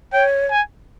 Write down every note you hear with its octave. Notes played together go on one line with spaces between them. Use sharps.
C#5 G5
G#5